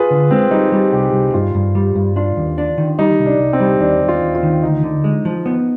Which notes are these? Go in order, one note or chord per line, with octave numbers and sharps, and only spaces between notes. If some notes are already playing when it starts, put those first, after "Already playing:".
Already playing: F4 G#4 B4
D3
G#3 C4
G3 D#4
G3
C2 G4
C2
G2 F4
G2
G3
G2
D4 F4
D#2
D4
D#3
G3 D#4
C2
D4
C2
C4
G3
D#2 D4
D#2
F4
D#2
F4
D#3
D2 D#4
D3
G#3
F3
B3